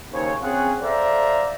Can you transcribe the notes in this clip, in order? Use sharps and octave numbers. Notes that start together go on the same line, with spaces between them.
D#2 C#3 C5 C#5
C4 C#4 F4 G#4 F#5
A4 C5 D5 E5 F5 A#5